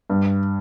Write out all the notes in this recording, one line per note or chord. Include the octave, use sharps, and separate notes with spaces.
G2